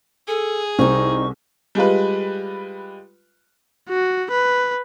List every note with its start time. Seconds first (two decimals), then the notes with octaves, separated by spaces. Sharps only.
0.28 G#4 A4
0.79 C2 C4 D#4 C#6
1.75 G3 G#3 F4 B4
3.89 F#4
4.31 B4